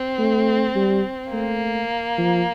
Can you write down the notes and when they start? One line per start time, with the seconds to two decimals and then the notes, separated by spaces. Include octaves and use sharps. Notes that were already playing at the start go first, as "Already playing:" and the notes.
Already playing: C4
0.18 A3
0.75 G3
1.32 A3 A#3
2.18 F3